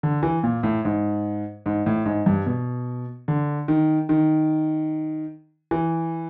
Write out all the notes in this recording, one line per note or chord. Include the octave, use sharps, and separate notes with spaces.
D3
E3
A#2
A2
G#2
G#2
A2
G#2
G2
B2
D3
D#3
D#3
E3